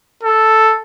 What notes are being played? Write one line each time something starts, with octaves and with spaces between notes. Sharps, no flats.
A4